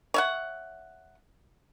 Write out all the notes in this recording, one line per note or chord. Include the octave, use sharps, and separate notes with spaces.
C#5 E5 F#5